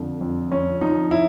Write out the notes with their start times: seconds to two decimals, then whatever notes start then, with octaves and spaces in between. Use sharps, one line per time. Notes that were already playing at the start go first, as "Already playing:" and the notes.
Already playing: F2 D3 F3
0.21 F2
0.51 F2 C#4
0.81 F3 D#4
1.11 E4